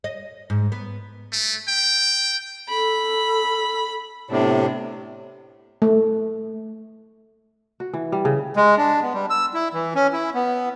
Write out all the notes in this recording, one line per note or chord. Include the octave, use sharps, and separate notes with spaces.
D#5
G#2
B3
A3
G5
A4 B5
A2 C3 B3 D4
A3
F#4
E3
G3
C#3
G#3
D4
B3
G3
E6
E4
E3
C#4
E4
B3